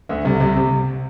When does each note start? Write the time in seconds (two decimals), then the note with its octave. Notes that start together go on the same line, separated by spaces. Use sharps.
0.09 D2 D3
0.25 C2 C3
0.40 C2 C3
0.56 C3